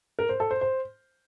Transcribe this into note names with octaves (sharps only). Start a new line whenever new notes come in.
A#4
C5
A4
C5
C5